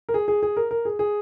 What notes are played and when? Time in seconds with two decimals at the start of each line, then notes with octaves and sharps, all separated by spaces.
0.09 A#4
0.14 G#4
0.28 G#4
0.43 G#4
0.57 A#4
0.71 A#4
0.85 G#4
0.99 G#4